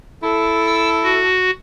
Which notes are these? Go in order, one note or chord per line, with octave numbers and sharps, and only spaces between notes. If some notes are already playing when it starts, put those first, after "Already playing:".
E4 A4
E6
F#4